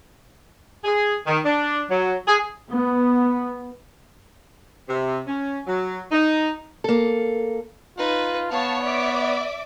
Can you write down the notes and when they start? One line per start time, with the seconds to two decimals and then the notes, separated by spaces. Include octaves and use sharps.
0.85 G#4
1.26 D#3
1.45 D4
1.90 F#3
2.27 G#4
2.71 B3
4.89 C3
5.27 C#4
5.67 F#3
6.12 D#4
6.84 A#3 A4
7.98 D#4 F4 B4
8.51 B3 C#5 F5 A5 C#6
8.82 D5 E5 D6